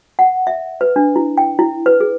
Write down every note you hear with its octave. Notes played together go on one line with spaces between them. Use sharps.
F#5
E5
B4
D4
E4
G5
E4
B4
G#4